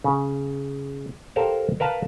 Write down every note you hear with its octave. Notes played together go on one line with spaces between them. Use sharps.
C#3
G4 A4 A#4 C5 F5 A5
A#4 B4 F5 A5